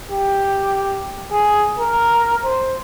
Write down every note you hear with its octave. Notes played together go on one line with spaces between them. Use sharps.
G4
G#4
A#4
C5